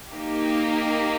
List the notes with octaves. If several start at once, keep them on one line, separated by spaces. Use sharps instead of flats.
A#3 D#4 G4